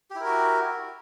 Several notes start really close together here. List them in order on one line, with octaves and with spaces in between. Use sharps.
G4 E4 A#4 F#4